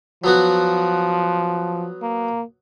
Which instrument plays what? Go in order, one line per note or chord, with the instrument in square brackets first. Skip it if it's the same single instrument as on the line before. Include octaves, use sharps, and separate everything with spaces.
[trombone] F3 [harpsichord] F#3 B3 F#4
[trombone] A#3